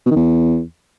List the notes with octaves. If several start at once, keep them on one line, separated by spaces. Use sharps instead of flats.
B2
D#3
E2